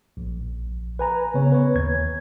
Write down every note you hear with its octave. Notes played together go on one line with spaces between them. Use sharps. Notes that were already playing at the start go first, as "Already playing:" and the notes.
A#1
B4 G#5 A#5
C#3 B3 C#5
B4 C#5
D#2 G#6